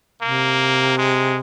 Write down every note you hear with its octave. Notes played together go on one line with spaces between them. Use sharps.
C3 A#3
G#3